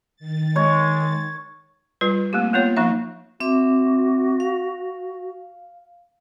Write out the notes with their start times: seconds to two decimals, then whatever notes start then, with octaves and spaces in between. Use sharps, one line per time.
0.16 D#3 A6
0.56 G#3 C#5
2.01 G3 F4 B4
2.33 A3 A#3 C4 G4
2.53 A#3 B3 F4 C#5
2.77 F3 A#3 D#4 E5
3.40 C4 F#4 E5 D6
4.40 F5